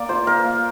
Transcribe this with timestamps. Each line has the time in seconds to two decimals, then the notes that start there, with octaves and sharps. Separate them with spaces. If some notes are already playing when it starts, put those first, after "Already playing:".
Already playing: A#3 D5
0.09 F4 C5
0.27 A#3 A#4
0.44 A#3